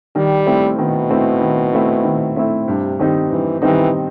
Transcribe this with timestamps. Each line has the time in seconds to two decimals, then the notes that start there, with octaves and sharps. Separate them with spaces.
0.15 D#3 G3
0.47 A3 C4 E4
0.78 B2 D#3
1.10 A3 C4 E4
1.41 D#3
1.73 A3 C4 E4
2.04 D#3
2.36 A3 C4 E4
2.67 G2 C3
2.99 D#3 G3 C4 D#4
3.31 G2 E3
3.62 D#3 E3 G3 C4 D#4